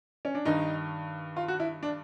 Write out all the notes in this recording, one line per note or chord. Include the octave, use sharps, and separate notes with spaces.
C#4
D4
G2 D#3 D#4
F4
F#4
E4
D4